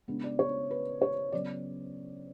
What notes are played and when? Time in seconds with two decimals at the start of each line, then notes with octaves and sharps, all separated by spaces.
0.08 C#3 G#3 B3 D4
0.24 D5
0.39 C#5
0.71 B4
1.02 C#5
1.32 C#3 F#3 B3 D5